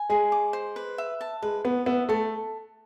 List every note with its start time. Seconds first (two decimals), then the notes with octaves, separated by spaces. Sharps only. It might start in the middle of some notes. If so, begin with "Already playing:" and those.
Already playing: G#5
0.10 G#3 G#4
0.32 D6
0.53 C5
0.76 B4
0.98 E5
1.21 A5
1.43 G#3 B4
1.65 B3 B4
1.86 B3 E5
2.09 A3 A5